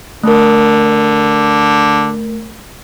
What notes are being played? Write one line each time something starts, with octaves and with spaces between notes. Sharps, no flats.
D3 A3 A#4